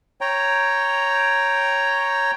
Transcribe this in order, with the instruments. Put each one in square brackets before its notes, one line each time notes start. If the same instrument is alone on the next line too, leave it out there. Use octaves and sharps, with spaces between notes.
[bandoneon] C#5 G5 A#5